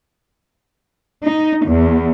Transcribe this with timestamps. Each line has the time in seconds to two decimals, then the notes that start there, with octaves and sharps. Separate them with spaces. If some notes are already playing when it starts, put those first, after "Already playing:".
1.24 D#4
1.64 E2